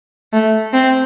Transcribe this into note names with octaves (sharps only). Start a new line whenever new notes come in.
A3
C4